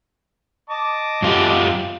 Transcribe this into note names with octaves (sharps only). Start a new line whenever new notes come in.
D#5 A5 D6
F#2 F4 G4